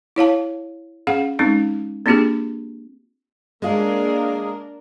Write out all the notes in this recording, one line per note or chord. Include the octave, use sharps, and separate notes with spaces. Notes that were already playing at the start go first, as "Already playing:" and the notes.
E4 C#5 F5 A5
C#4 G#4 F5 F#5
G#3 C4 C#4 D#4
A#3 C4 D4 F4 G4 G#4
G#3 A#3 D4 F4 G#4 A#4